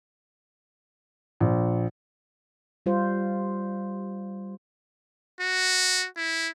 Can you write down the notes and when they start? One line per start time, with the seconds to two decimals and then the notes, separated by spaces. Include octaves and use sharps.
1.40 A#1
2.86 G3 F4 C5
5.41 F#4
6.17 E4